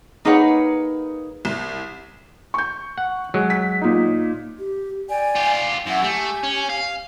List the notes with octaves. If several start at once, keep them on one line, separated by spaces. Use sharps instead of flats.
A#3 D#4 G#4 B4 C#5 F#5
C2
C#6 G6
F#5
F#3 G#3
B6
A#2 D#4
G4
D5 G5 G#5
F4 G4
F#2 E4 F#5 G5
A3 G4 G#5
C#4
F5